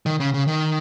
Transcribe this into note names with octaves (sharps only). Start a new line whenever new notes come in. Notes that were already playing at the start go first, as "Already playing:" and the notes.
D#3
C#3
C#3
D#3